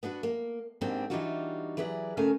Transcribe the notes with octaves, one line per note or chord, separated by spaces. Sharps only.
B3 D4 F#4 B4
A#3
G#2 B2 G3 A#3 C4 D4
E3 G3 D4 D#4 F4 F#4
E3 F#3 G#4 B4 D5
C#3 A3 A#3 F5 G#5